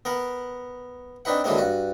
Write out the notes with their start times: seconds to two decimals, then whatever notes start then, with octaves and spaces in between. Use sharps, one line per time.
0.05 B3 A#4 F#5
1.25 C4 D4 D#4 B4 F#5
1.44 D3 E3 F#3 G#3 A#3 C4
1.58 G2 F#4